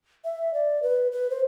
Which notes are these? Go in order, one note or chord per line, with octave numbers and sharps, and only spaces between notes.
E5
D5
B4
B4
C5